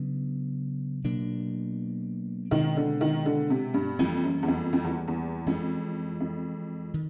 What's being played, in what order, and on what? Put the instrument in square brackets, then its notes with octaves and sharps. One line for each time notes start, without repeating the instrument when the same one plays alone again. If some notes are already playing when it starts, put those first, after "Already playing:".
Already playing: [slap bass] C#3 F#3 B3 D4
B2 F#3 A#3 D4
[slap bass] B2 G#3 C4 [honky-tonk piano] D#3
[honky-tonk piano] D3
D#3
D3
C3
G2
[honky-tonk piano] F2 [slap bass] E3 G3 A#3 C#4
[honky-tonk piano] F#2
E2
F2
F2
E2
E2
[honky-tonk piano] F2 [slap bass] E3 G#3 C#4
[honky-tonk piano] F2
[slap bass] D#3